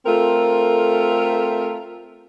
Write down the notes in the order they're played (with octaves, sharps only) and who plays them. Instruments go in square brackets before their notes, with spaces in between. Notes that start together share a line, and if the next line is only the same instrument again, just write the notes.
[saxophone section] A3 C4 F4 A4 A#4